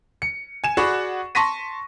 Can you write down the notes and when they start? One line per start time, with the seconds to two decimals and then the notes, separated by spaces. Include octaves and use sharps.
0.22 C#7
0.64 G#5 E7
0.77 F#4 G#4 D5 F#5 B5 C#6
1.35 A5 C6 C#6 A#6 B6 D#7